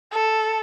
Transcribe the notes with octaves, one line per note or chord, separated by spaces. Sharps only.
A4